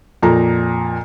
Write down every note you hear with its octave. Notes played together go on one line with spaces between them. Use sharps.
F2 A#2 A#5